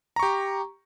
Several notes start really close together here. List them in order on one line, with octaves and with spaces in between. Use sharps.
A#5 C#6 G4